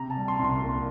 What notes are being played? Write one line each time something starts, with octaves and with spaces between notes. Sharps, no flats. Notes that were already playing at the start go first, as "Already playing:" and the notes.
Already playing: C3 A#5
A5
G3
C6
C2
C6
A#3